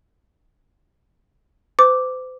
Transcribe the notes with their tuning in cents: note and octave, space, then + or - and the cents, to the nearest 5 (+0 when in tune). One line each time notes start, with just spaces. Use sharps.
C5 -40 D6 -5